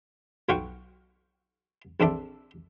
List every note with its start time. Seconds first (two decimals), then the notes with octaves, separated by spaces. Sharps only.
0.49 B1 F#3 F4 F#4 G5 C#6
2.00 A#1 C4 D4 A4 E5 D6